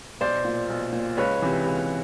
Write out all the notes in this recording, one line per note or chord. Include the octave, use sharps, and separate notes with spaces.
B1 C5 D5
A#2
B1
A#2
C#2 B4 C#5
C3 E3
C#2